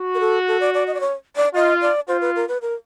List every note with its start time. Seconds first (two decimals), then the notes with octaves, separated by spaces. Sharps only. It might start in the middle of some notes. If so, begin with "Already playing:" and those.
Already playing: F#4
0.15 A#4
0.20 A4
0.48 A4
0.61 D5
0.74 D5
0.87 D#5
0.94 D5
1.00 C#5
1.36 D5
1.55 F4 D#5
1.82 D5
2.08 F4 C5
2.21 B4
2.36 A#4
2.48 B4
2.62 A#4